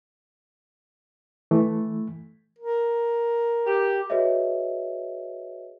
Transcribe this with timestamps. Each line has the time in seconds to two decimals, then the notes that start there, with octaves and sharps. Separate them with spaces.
1.51 E3 A3
2.59 A#4
3.67 G4
4.10 F#4 G#4 B4 C#5 D#5 E5